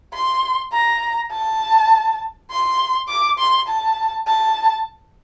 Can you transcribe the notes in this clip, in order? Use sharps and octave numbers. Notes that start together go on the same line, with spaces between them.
C6
A#5
A5
C6
D6
C6
A5
A5